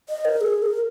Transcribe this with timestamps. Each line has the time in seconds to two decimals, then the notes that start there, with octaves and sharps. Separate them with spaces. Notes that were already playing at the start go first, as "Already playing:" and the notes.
0.09 D#5
0.25 A#4
0.41 G#4
0.62 A#4